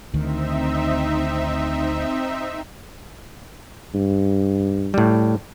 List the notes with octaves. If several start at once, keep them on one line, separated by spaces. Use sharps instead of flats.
D2 D#3 C4 D#4 E5
G2
A2 G3